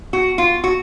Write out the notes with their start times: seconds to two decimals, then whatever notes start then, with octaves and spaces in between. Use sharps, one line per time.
0.13 F#4
0.38 F4
0.64 F#4